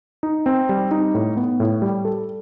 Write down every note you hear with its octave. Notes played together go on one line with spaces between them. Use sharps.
D#4
C4
G3
D#4
A2
B3
A2
G3
A4